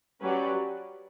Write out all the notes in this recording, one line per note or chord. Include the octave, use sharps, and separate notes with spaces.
F#3 C#4 G4 B4 D5